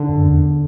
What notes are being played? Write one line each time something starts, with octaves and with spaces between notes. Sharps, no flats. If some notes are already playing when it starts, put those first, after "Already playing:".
Already playing: D3
F#2
E2